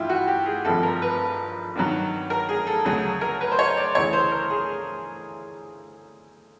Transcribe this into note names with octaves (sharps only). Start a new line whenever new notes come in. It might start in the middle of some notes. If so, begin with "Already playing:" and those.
Already playing: A1 G2 D#3 E4 F4 G4
F#4
G4
G#4
G#1 G2 D3 F3 A4
A#4
B4
G2 D#3 F#3
A#4
G#4
A4
D2 C#3 F#3 G#4
A#4
B4
C5
C#5
D5
D2 C#3 E3 C#5
C5
A#4
G#4